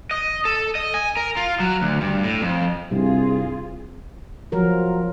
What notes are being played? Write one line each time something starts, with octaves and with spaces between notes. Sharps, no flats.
D#5
A4
D#5
G#5
A#4
F4
F#3
D2
G2
A2
F2
C2 G2 C3 C4 F4 G#4
F3 F#3 A#4